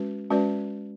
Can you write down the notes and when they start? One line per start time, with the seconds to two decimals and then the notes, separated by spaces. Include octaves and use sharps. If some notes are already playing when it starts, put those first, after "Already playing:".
Already playing: G#3 C#4 F#4 B4
0.30 G#3 C#4 F#4 B4 D5